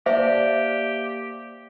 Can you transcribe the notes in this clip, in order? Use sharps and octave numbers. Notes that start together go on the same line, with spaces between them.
A#3 G4 C5 D5 E5 A5